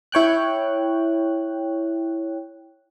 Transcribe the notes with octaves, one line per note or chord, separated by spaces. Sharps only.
E4 C#5 G5 F#6